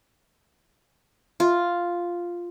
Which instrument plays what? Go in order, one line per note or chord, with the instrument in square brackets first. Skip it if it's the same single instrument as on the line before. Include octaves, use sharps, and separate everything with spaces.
[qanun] F4